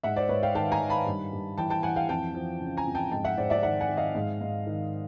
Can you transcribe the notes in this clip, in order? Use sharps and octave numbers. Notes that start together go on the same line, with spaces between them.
G#2 E5 F#5
C5 D5
G#2 B4 C#5
F5 G5
D#3 G5 A5
G#5 A#5
D#3
A5 B5
G2
G2
E3 G5 A5
G5 A5
E3 F#5 G#5
F5 G5
F2 G5 A5
F3
C#3
G#5 A#5
F2
G5 A5
G#2 G5 A5
E5 F#5
G#2 C5 D5
D5 E5
D#3 E5 F#5
F#5 G#5
D#3
D#5 F5
G#2
G#2
D#3